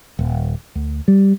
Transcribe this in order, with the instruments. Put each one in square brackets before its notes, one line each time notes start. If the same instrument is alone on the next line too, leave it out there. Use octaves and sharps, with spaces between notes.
[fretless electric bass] D#1
D2
G3